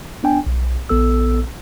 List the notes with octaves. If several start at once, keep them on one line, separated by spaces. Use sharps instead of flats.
B3 D4 G5 G#5
B1
A#1 B3 A4 E6